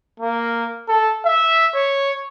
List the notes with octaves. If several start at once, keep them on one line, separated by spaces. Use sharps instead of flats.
A#3
A4
E5
C#5